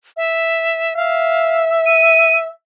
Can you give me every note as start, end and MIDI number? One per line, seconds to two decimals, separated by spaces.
0.17 0.96 76
0.96 2.51 76
0.96 1.64 77
1.86 2.38 99